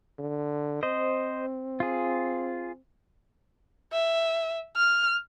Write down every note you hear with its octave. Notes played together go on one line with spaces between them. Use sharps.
D3
C4 C5 D#5
F4 G#4
E5
F6